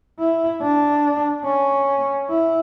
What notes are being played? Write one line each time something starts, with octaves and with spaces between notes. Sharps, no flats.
E4
D4
C#4
E4